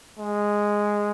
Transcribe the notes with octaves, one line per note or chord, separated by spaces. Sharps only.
G#3